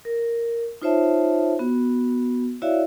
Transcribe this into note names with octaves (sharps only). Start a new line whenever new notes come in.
A#4
D#4 F4 C5 C#5 E5 A5
B3 F#4
E4 F#4 C#5 D5 E5 F5